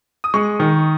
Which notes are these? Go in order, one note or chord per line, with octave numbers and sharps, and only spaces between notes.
D#6
G#3 C#6
D#3